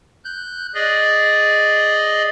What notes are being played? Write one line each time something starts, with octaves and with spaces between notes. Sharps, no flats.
F#6 G6
G#4 D5 D#5